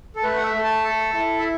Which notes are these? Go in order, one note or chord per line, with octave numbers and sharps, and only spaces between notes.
A4
A3 B4
F#5
E5
A3
A5
A4
E4
E5